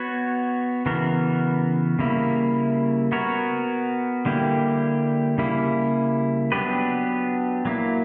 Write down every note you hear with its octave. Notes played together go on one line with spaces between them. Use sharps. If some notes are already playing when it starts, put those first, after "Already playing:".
Already playing: B3 F#4 C#5
C#3 E3 B3 F#4 A#4
C#3 G3 A#3 E4
B3 F#4 A#4 C#5
D3 G3 A#3 E4 G4
C#3 G3 A#3 E4
F#3 B3 D4 G4 B4
F#3 A#3 E4